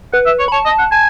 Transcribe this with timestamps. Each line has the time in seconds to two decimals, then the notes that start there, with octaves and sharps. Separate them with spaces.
0.13 B4 F#5
0.26 E5
0.39 C#5
0.48 B5
0.52 C#5 A5
0.66 D#5
0.79 F#5
0.91 G#5 A5